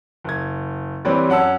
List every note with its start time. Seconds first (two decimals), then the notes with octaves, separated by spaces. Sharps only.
0.25 F#1 G#6
1.05 E3 G3 C4 B4 C#5 D5
1.29 F#2 C#4 F#5 A5 E6